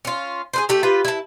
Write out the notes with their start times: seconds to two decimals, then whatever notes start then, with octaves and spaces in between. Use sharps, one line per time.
0.05 C#4 F4
0.53 G#4 B4 C5
0.69 A3 G4
0.83 F4 G4 B4
1.05 E4 A5